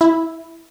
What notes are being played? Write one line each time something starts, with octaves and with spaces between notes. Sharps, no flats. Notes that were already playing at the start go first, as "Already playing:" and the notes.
E4